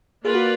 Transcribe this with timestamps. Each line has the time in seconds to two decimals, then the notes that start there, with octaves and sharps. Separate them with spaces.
0.25 A#3 F4 G#4 B4 D5
0.35 F#4